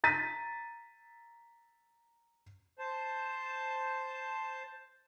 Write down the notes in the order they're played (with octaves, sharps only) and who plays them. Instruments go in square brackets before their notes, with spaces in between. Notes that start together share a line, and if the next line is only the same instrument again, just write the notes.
[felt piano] A#5 A6 B6 D#7
[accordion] C5 A5